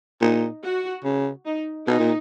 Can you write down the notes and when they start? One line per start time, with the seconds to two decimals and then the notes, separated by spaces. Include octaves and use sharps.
0.21 A#2 D#4
0.63 F#4
1.04 C#3
1.45 D#4
1.87 B2 D#4
2.00 A#2